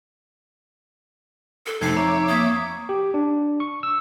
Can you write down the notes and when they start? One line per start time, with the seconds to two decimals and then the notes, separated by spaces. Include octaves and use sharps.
1.66 A4
1.81 F2 C3 A3 D#4 G#6 C7
1.97 C#5 E5 A#5 D6
2.28 A#3 D#6 G#6 B6
2.89 G4
3.14 D4
3.60 C#6
3.83 E6